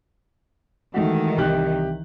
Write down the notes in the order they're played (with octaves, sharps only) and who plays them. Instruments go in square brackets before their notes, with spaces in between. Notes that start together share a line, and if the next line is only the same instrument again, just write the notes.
[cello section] D#3 E3 [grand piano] G#3 A3 F#4
[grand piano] C2 G4 F#6